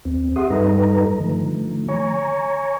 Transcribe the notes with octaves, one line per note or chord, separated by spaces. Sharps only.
D#2 C4
G4 G#4 E5 F#5 C6 D#6
G2 G3 D#4 A4 B4 A#5
D3 D#3 F3 A3
C#5 G#5 A#5 C#6